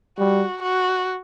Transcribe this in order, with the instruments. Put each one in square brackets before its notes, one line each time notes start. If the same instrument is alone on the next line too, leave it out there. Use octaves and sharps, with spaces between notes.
[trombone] G3 [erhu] F#4
[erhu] F#4